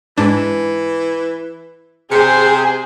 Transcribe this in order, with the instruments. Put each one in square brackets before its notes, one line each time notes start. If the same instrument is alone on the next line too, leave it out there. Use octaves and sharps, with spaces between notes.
[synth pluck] G#2 D4 [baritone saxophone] E3
[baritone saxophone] C3 [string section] G#4 [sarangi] C5 [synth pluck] C#7